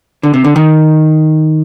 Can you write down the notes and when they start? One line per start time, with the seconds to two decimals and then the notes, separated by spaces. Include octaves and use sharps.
0.23 D3
0.34 C3
0.45 D3
0.56 D#3